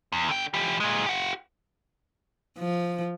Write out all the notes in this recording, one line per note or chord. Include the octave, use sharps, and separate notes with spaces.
E2
D3 G5
E3 G4
A#2 G#3
G4 F#5
F3